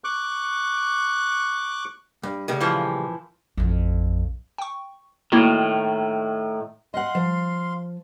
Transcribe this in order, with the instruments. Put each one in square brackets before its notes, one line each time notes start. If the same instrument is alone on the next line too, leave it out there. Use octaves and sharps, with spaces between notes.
[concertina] C#6 D6 F#6
[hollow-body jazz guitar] G2
A2 C#3 G3
[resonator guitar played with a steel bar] A#2 E3 F3
[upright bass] A1 F2
[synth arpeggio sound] G5 C#6
[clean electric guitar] A2 D#3 [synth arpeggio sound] A#3 E4 F#4
[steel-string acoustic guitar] D#5 F#5 [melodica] F5 C6
[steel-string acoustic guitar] F3